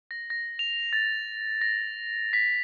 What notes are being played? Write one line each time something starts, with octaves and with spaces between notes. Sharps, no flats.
A#6
A#6
F7
A6
A#6
B6